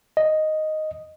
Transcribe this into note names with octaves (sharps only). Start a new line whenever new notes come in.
D#5